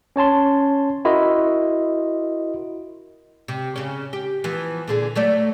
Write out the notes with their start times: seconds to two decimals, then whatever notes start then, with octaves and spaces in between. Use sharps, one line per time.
0.16 C#4 C#5 A5 C6
1.05 E4 F#4 A#4 D#5 C6
3.48 C3
3.76 C#3 C#4
4.13 G4
4.44 E3 F3 B3
4.88 A#2 D3 G#4
5.16 F#3 A3 D5